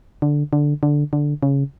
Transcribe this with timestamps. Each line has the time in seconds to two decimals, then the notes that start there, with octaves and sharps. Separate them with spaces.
0.22 D3
0.53 D3
0.83 D3
1.13 D3
1.43 C#3